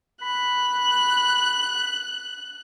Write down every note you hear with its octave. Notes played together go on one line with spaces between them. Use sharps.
B5 F#6